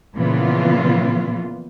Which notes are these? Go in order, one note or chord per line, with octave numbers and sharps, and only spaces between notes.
A#2 C#3 E3 F3 B3 F4